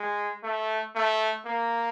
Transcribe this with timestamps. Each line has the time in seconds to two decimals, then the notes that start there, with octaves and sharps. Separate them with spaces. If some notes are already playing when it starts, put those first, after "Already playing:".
Already playing: G#3
0.44 A3
0.95 A3
1.46 A#3